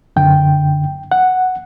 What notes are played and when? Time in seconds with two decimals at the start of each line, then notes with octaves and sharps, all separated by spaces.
0.16 F#2 D3 G5
1.12 F#5